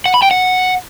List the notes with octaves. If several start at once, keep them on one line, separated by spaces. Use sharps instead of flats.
F#5
B5
G5
F#5